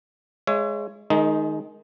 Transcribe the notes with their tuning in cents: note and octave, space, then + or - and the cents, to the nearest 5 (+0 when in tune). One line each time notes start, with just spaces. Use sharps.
G#3 +0 C#5 +0 E5 +40
D#3 +0 G#3 +25 D#4 +0